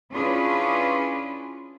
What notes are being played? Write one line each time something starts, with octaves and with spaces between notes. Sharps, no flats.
C#4 D4 E4 F4 G#4 B4